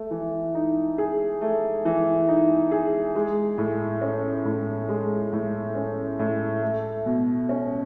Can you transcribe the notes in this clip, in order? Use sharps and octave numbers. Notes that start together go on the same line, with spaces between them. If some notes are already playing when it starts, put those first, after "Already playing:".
Already playing: A3
E3
D#4
G#4
A3
E3
D#4
G#4
G#3
A2
C#4
A2
G#3
A2
C#4
A2
A3
B2
C#4